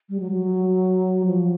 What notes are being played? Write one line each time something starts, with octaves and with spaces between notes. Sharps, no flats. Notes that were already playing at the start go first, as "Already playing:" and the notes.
G3
F#3
F#3
F3